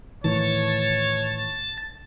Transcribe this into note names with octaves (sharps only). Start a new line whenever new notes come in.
A2 D#3 E3 C#5 A5 A6